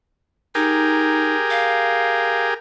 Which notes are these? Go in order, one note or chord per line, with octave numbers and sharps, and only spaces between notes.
D#4 G4 G#4 A#4
F5